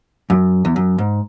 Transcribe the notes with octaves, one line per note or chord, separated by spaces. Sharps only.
F#2
E2
F#2
G#2